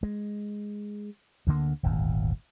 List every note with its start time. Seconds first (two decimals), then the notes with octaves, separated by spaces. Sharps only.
0.03 G#3
1.47 D2 D3 A#3
1.83 D#1 G#1 D2